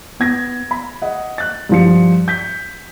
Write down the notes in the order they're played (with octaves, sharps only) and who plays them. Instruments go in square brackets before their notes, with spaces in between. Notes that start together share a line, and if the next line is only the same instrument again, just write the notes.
[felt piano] B3 G#6 A#6
B5
D#5 F#5
F#6 A6
G2 F3 C#7
G6 B6